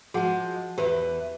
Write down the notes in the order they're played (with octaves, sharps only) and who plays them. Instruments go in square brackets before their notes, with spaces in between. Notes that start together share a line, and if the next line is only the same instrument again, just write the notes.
[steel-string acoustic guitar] F3 G#3 [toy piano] F#4 G#4 F#5
[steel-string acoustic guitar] E2 E3 [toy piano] G4 B4